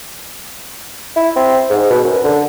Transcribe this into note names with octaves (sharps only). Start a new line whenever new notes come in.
E4
C4
G#2
B2
F#2
D3